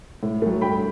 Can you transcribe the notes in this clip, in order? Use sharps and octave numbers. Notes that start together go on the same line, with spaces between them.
A2
F#3 A3
G2 G5 B5